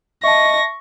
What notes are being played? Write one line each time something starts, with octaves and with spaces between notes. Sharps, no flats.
D#5 E5 A5 C#6 A#6